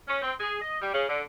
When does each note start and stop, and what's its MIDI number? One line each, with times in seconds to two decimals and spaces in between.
0.08 0.19 61
0.22 0.33 60
0.40 0.62 68
0.62 0.80 75
0.82 0.94 55
0.94 1.06 49
1.08 1.21 50